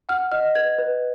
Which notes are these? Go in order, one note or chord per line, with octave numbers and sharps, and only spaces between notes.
F#5 F6
D#5 F6
B4 G#6
B4